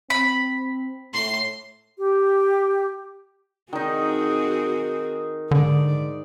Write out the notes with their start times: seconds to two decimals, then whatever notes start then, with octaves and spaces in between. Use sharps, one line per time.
0.10 C4 B5 B6
1.13 A2 C6
1.98 G4
3.73 D#3 C4 D#4 F#4 G#4
5.51 G#2 D3 D5